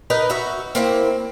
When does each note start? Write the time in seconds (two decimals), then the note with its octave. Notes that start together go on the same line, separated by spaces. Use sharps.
0.10 D#4 A#4 B4 D#5
0.30 F#4 E5
0.75 A#3 C4 E4